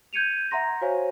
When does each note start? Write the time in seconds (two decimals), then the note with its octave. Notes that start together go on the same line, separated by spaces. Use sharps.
0.13 G6 G#6 C#7 D#7 F7
0.51 E5 F#5 A#5 C6 A#6
0.81 F#4 C5 C#5 F5 G#5